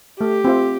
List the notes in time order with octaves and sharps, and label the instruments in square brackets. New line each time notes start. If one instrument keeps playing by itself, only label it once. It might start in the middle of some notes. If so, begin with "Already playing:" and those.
[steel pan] A3 [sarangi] G4
[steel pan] C4 F4 C5 E5